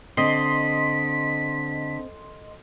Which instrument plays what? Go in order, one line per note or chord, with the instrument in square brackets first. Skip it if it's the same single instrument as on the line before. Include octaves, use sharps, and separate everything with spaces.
[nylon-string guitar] D3 [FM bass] C4 [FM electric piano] D#5 C6 [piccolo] B6